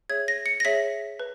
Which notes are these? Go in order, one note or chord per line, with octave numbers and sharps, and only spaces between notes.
G#4 C#5 E5 G#6
A#6
C#7
A#6
G#4 C#5 E5 B6
B4